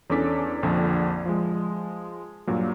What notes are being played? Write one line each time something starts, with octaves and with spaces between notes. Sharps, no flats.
E2 C#4 D4 A4 D6 B6
A#1 F2 D3 G#6
F3 G#3
G2 A#2 F#3